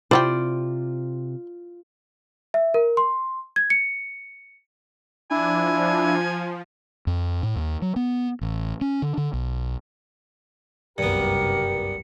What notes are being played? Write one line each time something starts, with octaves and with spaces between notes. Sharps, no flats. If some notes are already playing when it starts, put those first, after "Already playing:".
C3 C4 E4 F4 G4 C5 D5
E5
A#4
C6
G#6
C#7
F3 D4 E4 G#5
F2
A2
D#2
F#3
B3
A1
C#4
D3
D3
B1
F#1 C2 G2 B3 G4 A#4 C#7